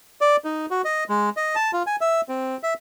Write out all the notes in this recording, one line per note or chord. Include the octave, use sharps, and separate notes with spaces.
D5
D#4
F#4
D#5
G#3
D#5
A5
F4
G#5
E5
C4
E5